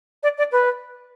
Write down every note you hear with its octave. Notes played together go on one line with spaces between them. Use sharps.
D5
D5
B4